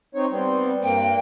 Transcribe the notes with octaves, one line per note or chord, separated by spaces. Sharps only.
C4 D#4 C#5
G3 B3 C4
G2 A#3 G5